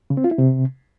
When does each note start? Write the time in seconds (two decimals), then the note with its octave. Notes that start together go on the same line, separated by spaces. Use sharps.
0.10 C#3
0.17 C4
0.24 F4
0.31 E4
0.38 C3